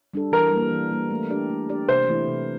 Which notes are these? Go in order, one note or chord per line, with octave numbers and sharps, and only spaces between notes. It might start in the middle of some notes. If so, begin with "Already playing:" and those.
G3 D4 A4
E3 A#4
G3 A#3
E3
G3 A#3
A3
D4 G4 D5
A3
D4 G4 D5
C3 C5
E3 A3 E4
C3